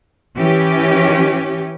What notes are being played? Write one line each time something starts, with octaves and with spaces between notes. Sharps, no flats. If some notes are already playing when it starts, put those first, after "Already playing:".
E3 C#4 G4